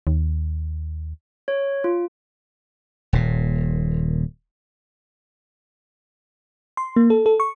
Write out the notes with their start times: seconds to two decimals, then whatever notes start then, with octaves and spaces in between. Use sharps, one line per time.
0.07 D#2
1.48 C#5
1.84 F4
3.13 D#1 A#2
6.77 C6
6.96 A#3
7.10 A4
7.26 A4
7.40 C#6